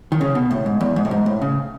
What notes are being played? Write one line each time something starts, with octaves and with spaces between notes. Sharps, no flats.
D#3
C#3
B2
A2
G#2
E2
G#2
A2
G#2
A2
C#3